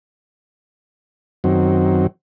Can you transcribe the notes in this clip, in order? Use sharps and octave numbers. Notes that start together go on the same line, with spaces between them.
F#2 D#3 F#3 C4